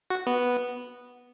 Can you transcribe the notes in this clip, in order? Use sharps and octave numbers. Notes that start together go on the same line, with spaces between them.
F#4
B3